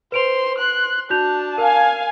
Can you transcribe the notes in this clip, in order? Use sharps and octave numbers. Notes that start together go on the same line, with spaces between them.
B4 C5 C6 D7 F7
C6 F#6
D4 F#4 A5 G6 F7
A#4 F5 G#5